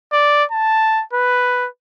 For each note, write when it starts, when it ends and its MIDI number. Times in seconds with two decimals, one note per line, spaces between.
0.13 0.44 74
0.51 1.03 81
1.13 1.68 71